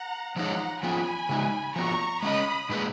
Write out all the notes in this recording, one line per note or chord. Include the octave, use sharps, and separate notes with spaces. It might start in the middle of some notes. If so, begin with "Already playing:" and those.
Already playing: F#5 A#5
F3 G#3 D#4 G#4 C#5 F#5 A#5
F3 B3 F4 G#5 B5
C#3 G#3 D#4
F3 B3 F#4 A#5 C#6
G#3 C#4 G#4 D#5 B5 D#6
A#2 G#3 D#4 G#4 B4